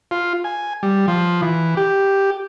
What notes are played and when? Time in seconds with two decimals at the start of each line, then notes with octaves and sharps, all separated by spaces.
0.11 F4
0.44 G#5
0.83 G3
1.08 F3
1.42 E3
1.77 G4